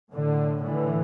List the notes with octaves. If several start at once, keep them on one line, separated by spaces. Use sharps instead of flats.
A2 D3
D3 E3